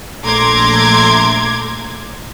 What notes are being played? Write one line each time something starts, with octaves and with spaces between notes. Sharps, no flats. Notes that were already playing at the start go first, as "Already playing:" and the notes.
A#1 A3 A#5 C6 D6 G#6